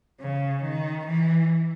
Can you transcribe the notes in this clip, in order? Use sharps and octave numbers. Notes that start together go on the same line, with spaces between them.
C#3
D#3
E3